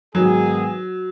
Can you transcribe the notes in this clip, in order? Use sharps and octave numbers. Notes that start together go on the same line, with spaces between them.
G#2 D#3 F#3 B3 G#4